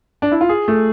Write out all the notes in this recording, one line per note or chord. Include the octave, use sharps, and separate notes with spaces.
D4
E4
F4
G#4
A3